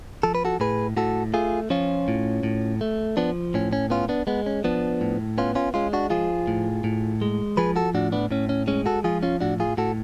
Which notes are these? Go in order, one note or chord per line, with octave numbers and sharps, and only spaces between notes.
F3 A4
B4
F#4 A4
A2 G#4 B4
A2 F#4 A4
A3 F4 G#4
F3 C#4 F4
A2
A2
A3
F3 B3 D4
A2 C#4
C#4
B3 C#4 F4
B3 D4
G#3 B3
C#4
F3 B3 D4
A2
B3 C#4 F4
C#4 F4
G#3 C#4 F4
D4 F#4
F3 F4 G#4
A2
A2
G#3
F3 G#4 B4
F#4 A4
A2 D4 F#4
B3 D4
A2 C#4
C#4
G#3 C#4
F#4 A4
F3 F4 G#4
C#4 F4
A2 D4 F#4
F4 G#4
A2 F#4 A4